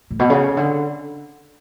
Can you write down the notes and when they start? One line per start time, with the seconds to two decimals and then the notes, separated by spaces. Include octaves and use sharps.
0.11 A2
0.19 B2
0.30 C#3
0.57 D3